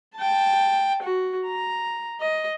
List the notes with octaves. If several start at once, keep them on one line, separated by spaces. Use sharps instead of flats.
G5 A5
F#4
A#5
D#5